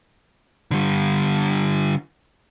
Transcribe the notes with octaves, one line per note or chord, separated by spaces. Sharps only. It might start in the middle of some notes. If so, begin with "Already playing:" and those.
D3 G3